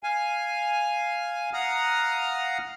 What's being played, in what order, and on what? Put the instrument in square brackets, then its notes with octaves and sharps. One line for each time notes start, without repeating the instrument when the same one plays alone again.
[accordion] F5 G#5
F5 F#5 A#5 D#6 F6